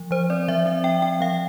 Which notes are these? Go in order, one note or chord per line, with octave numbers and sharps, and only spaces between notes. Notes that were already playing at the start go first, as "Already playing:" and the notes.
Already playing: F3
F3 C5
C4 D5
F3 E5
C4 E5
C4 G5
C4 G5
F3 F5